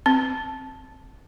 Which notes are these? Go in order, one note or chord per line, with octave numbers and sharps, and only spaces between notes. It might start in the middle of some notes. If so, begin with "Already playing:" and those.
C4